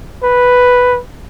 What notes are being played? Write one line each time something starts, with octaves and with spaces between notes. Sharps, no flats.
B4